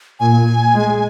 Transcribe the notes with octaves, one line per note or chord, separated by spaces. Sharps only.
A#2 G#5
G#3